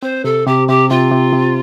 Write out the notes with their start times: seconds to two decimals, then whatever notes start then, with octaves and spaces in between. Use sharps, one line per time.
0.02 C4 C5
0.24 C3 A4
0.47 C3 G4
0.68 C3 G4
0.90 C3 F4
1.12 C3
1.33 C3